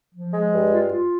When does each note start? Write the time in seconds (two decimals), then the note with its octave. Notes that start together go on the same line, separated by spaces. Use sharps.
0.14 F3
0.33 G#3
0.52 G2
0.72 F4
0.92 F4